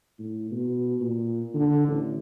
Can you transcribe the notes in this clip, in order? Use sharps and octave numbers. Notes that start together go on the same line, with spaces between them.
A2
B2
A#2
D3
A1